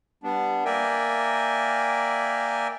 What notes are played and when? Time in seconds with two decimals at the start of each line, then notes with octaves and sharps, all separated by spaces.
0.24 G3 B3 D4
0.65 A#3 A#4 D5 E5 G5 G#5